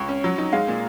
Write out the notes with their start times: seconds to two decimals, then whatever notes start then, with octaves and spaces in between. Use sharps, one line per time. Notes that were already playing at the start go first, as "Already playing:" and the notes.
Already playing: C#2 C#5
0.09 C#4
0.24 F#3
0.38 D#4
0.53 G#3 F5
0.68 A#2